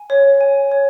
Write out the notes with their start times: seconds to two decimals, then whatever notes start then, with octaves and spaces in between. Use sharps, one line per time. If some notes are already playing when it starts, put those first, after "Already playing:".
Already playing: G#5
0.10 C#5
0.41 G#5
0.72 C#5